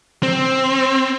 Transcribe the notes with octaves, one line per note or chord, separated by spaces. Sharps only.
C4